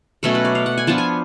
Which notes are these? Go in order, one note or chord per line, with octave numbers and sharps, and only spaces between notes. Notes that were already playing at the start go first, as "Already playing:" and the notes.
B2 F#3 A3 C#4 A4
B4
D5
F5
F#5
G#5
F3 B3 D4 F4 A5
G#5